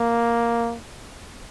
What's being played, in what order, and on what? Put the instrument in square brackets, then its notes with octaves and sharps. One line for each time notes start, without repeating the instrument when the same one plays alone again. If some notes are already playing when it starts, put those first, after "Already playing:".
Already playing: [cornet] A#3